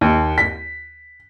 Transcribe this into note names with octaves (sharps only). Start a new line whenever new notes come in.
D#2
B6